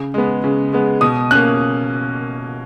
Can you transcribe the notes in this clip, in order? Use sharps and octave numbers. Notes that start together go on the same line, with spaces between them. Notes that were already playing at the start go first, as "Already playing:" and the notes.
Already playing: C#3
G#3 B3
C#3
G#3 B3
B2 D#6
A#3 C#4 F#6